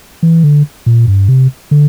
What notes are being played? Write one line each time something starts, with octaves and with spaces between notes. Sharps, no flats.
E3
D3
A#2
G2
C3
D3